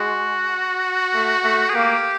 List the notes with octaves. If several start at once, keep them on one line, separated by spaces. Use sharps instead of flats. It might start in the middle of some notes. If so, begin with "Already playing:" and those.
Already playing: G#3 F#4
A3
A3
G#4
A#3 G4